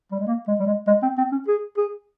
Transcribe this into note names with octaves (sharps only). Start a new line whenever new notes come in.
G3
G#3
A#3
G#3
G3
G#3
G#3
C4
C4
C#4
G#4
G#4